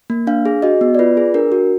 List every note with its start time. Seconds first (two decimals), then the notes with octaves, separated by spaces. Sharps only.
0.10 A#3
0.27 D4 F5
0.46 G#4
0.62 F#4 D#5
0.81 B3
0.95 D5
0.99 F4 B4
1.17 G#4
1.34 D4 A#4
1.52 F#4